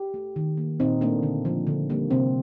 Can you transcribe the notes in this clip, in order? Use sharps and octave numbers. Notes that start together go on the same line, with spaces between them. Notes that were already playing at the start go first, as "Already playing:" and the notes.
Already playing: G4
A3
D#3
A#3
A#2 C4 D#4
A3 A#3 D4
D3
F3 A3
D3
G3 A#3
C3 C4